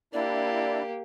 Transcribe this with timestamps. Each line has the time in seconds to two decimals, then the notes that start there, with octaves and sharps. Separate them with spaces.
0.13 A#3 D4 E4 G4 D5